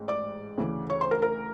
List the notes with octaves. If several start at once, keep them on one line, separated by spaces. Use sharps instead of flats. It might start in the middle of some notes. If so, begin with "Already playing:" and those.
Already playing: A1 G#2
D5 D6
D2 C#3 E3
C#5 C#6
C5 C6
A#4 A#5
A#4 A#5